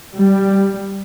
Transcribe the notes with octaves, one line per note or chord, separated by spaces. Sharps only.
G3